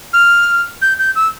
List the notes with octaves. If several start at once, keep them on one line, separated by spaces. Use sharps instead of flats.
F6
G6
G6
E6